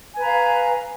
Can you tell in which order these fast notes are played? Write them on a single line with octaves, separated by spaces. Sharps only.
G#5 B4 A#5 F5